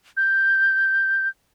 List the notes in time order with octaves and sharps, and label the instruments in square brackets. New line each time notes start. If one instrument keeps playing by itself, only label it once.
[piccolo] G6